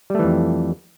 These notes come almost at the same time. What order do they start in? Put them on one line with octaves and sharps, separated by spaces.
G3 A3 E3 F2